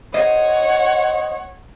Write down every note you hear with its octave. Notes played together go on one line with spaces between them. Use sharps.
C5 C#5 D#5 F#5